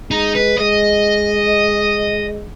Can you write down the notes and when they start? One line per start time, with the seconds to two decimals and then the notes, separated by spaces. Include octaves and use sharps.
0.11 G#3 D#4
0.35 B4
0.58 G#3 D#5